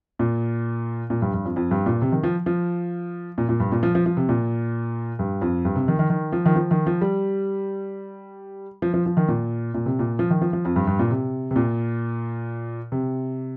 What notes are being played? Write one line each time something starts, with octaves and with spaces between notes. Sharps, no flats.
A#2
A#2
G2
G2
F2
F2
G2
A#2
C3
D#3
F3
F3
A#2
A#2
G2
A#2
F3
F3
F3
C3
A#2
G2
F2
G2
C3
D#3
D#3
D#3
F3
D#3
F3
D#3
F3
G3
F3
F3
F3
D#3
A#2
A#2
C3
A#2
F3
D#3
F3
F3
F2
G2
G2
A#2
C3
C3
A#2
C3